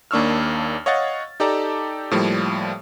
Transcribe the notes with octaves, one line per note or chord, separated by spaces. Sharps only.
D#2 A#3 D4 C#6 E6 F6
C#5 D#5 F5 F#5 C#6 A6
D#4 G4 A4 D5 A5 A#5
A2 F3 G3 A#3